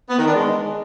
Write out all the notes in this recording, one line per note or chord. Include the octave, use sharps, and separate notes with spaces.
B3
D#3
D4
G#3